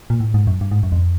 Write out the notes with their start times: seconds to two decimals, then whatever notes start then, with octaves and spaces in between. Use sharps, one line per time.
0.10 A#2
0.20 A2
0.34 G#2
0.47 F#2
0.61 G2
0.71 G#2
0.83 F#2
0.92 F2